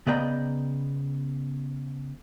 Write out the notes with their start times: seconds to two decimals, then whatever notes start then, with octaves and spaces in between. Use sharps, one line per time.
0.07 C#3 B3 D5 D#5 G5 A#5